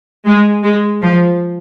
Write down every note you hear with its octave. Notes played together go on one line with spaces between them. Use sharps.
G#3
G#3
F3